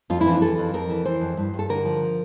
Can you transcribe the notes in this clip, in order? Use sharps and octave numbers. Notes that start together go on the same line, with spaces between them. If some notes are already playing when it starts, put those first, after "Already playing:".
F2 F4
E4
E3 D4
E3 A4
F2
F2 A#4
E3
E3 C5
F2
G2
G2
A4
D3 A#4
F3